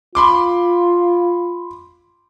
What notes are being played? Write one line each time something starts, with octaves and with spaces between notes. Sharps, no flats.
F4 B5 C6 D6